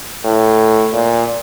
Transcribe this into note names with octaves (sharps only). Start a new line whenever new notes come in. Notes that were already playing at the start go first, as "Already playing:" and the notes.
A2
A#2